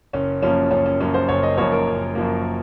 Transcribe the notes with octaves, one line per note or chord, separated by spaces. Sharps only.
F#1 C#4
F#2 F3 A#3 C#4
F#1 C#4
C#4
F#2 F3 A#3 C#4
C5
F#1 C#5
D#5
F#2 F3 A#3 C#5
A#4
F#1
F#2 F3 A#3